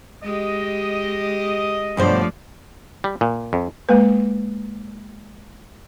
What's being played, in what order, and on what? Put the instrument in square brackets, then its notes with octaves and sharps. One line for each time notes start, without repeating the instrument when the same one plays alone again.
[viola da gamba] G#3 G4 [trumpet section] D#5
[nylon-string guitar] G2 B2 C5 [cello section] F3 A3 D5
[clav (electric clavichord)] G3
A#2
F2
[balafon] G#3 A#3 B4